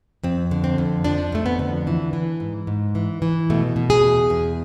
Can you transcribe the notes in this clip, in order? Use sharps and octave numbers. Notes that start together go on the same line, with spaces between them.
F2 C4
D3
C4
F2
F3 D4
F2 A3
B3
D3
E3
E3
G#2
G#2
E3
E3
B2 A3
B2
G#4
E2
E2